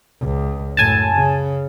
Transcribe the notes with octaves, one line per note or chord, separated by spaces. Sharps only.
C#2
F#2 A2 G#5 A5
C#3